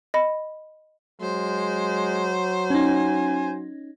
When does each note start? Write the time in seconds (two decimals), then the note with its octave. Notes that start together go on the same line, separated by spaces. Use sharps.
0.14 D#5 B5
1.22 F#3 G#3 C5
2.70 C#4 D#4 G#5